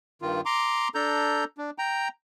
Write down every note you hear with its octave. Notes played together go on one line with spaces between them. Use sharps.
G2 D#3 F4
A#5 C6 D6
D4 A4 A#5 G6
D4
G5 A#5